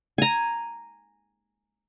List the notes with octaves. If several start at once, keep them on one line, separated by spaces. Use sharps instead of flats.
G#5 A#5